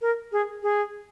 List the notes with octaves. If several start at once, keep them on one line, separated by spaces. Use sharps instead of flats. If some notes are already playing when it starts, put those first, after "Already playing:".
A#4
G#4
G#4